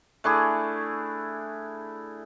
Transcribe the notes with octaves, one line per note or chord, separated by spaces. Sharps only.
A3 D4 E4 G#4